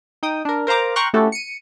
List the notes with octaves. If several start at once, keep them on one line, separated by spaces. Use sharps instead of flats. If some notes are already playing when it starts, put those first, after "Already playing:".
D#4 G5 D#6
D4 A#4
A#4 C5 F5 A#5 D6
G5 A#5 C6 C#6 F6 F#6
A3 C#4 E4 F#4 G4 A4
C#7 D#7